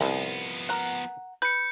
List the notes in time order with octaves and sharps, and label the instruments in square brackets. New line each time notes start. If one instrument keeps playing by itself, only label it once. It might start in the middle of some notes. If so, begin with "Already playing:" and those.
[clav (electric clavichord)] C2 [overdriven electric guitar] F3 B3
[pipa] A#4 F#5
[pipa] B4 [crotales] G6 C#7